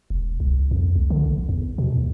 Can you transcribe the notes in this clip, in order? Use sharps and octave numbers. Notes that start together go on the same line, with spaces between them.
E1
C2
F2
C2
D3
A#1
E2
B2
D#2